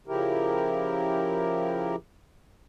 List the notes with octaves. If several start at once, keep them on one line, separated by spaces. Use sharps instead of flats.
C#3 F3 E4 G4 A#4